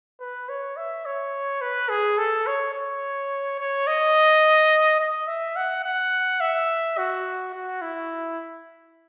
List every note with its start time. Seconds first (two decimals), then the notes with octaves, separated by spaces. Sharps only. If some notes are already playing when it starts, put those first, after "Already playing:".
0.20 B4
0.49 C#5
0.77 E5
1.06 C#5
1.61 B4
1.89 G#4
2.18 A4
2.47 C#5
2.74 C#5
3.60 C#5
3.87 D#5
5.00 D#5
5.28 E5
5.56 F#5
5.85 F#5
6.41 E5
6.98 F#4
7.54 F#4
7.82 E4